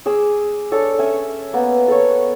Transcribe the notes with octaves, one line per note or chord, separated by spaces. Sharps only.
G#4 D6 E6
D4 A4 C#5
C#4 E5 G#5
A#3 B3
A4 C#5